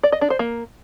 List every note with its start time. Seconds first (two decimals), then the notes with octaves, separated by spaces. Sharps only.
0.03 D5
0.12 D#5
0.21 D4
0.30 C5
0.39 A#3